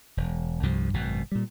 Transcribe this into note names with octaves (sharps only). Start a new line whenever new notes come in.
E1
C2 G2 C3 F3
G#1 F#2 B2
A#2 G3